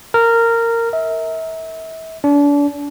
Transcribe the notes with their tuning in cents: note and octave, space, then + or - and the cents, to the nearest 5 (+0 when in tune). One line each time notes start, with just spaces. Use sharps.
A#4 -15
E5 -35
D4 -35